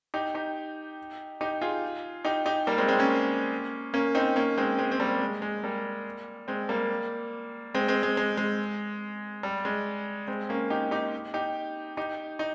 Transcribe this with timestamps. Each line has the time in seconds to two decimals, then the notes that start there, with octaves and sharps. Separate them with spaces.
0.14 D#4 G4
0.35 D#4 G4
1.41 D#4 G4
1.61 F4 G#4
2.25 D#4 G4
2.46 D#4 G4
2.67 G3 A#3
2.78 G#3 C4
2.88 G#3 C4
2.99 A#3 C#4
3.94 A#3 C#4
4.15 C4 D#4
4.36 A#3 C#4
4.57 G#3 C4
4.78 G#3 C4
4.91 C4
5.00 G3 A#3
5.21 G#3
5.42 G#3
5.63 G3 A#3
6.48 G#3 C4
6.69 G3 A#3
7.74 G#3 C4
7.88 G#3 C4
8.03 G#3
8.17 G#3
8.37 G#3
9.43 G3
9.65 G#3
10.28 G#3 C4
10.49 A#3 C#4
10.70 D#4 G4
10.91 D#4 G4
11.34 D#4 G4
11.97 D#4 G4
12.39 D#4